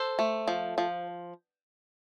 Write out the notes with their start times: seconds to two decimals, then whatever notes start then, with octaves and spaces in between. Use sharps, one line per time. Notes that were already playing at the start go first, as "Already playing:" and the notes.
Already playing: A4 C5
0.19 A3
0.48 F3
0.78 F3